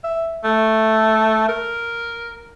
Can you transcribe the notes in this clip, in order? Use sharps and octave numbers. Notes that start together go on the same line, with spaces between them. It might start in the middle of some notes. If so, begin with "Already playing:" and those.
E5
A3
A#4